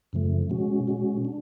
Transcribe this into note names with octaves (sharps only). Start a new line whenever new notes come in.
F#2 C#3 F3 A3
B2 G#3 C#4 F#4
B2 G#3 C#4 F#4
D4